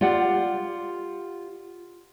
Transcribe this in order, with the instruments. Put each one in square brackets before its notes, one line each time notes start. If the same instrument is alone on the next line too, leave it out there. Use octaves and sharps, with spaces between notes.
[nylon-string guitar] F4 G4 D5 F#5